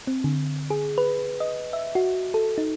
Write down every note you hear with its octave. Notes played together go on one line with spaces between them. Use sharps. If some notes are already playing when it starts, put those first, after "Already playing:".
C4
D3
G#4
B4
D#5
E5
F#4
A4
D#4